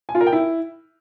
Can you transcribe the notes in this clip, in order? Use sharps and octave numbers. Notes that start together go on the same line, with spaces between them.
G#5
F4
A#4
G5
E4